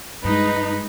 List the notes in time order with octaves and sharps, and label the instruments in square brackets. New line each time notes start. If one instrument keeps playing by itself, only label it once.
[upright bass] G2 [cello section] G#3 D#4 [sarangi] B4